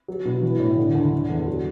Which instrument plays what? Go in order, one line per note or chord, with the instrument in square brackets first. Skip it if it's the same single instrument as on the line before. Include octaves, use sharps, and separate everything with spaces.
[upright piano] F#3
B2
E3
A2
D3
D2
D3
E2
F#3